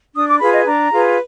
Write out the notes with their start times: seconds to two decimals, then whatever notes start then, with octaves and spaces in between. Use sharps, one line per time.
0.15 D4 D#6
0.29 D6
0.41 F4 G#4 B4 B5
0.53 D#5
0.66 D4 A#5
0.91 F4 G#4 B4